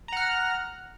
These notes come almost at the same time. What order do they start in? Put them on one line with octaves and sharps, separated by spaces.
A#5 F#5 F6